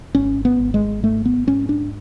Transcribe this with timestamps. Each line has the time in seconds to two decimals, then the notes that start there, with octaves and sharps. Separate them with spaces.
0.15 G#1 C#4
0.45 B3
0.60 G#1
0.74 G#3
1.03 G#2 A3
1.25 B3
1.47 G#2 C#4
1.69 D4